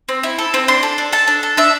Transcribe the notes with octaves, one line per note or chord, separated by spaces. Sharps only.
C4
E4
A4
C4
D4 C6
A4
D4
A4 A5
D4
A4
D4 E5